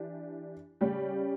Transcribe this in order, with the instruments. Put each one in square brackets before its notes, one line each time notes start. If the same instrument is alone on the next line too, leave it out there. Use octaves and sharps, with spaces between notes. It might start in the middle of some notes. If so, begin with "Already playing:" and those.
Already playing: [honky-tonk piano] E3 D4 G4
C#3 G3 C#4 G4